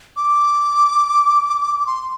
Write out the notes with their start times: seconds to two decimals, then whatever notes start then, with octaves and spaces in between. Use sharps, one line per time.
0.16 D6
1.87 C6